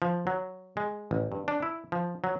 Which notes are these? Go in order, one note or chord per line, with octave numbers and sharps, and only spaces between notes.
F3
F#3
G#3
A1
G2
D4
E4
F3
F#3